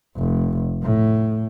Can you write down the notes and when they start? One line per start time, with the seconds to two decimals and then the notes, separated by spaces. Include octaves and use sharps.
0.17 F1
0.83 A2